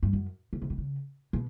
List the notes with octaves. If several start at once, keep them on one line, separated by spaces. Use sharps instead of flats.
G2
F#2
D3
C#3
B2
C#3
B2